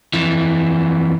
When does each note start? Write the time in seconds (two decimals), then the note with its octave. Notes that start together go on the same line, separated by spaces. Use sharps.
0.14 F2 E3